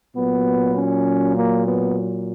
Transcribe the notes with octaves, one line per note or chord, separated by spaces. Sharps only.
A#2 F#3 B3
C#4
A#3
B3